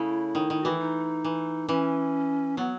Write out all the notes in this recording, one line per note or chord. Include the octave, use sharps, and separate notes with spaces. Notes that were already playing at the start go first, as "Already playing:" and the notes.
Already playing: C#3 A3 E4
D#3
D#3
E3 F#4
E4
D#4
E3
E3 C#4
F#3 B3